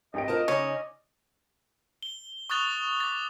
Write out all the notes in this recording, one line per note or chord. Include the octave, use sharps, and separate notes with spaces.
G#1 G4 D#5 D7
F4 F#4 A#4 C5 A5
C#3 C#4 D#4 D5
G7
C#6 D#6 F#6 A6 F7 G7
D6 A6